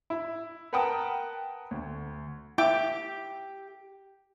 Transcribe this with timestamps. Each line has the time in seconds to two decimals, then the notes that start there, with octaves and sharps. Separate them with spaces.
0.10 E4
0.73 A#4 B4 F#5 G5 A5 D#6
1.71 D2
2.58 E4 G4 E5 D6